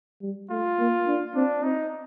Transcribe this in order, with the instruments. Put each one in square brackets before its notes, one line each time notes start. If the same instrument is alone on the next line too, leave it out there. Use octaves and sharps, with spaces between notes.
[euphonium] G3
[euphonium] A3 [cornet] F4
[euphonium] A#3
D4
[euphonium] C4 [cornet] D4
[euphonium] C4 [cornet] D#4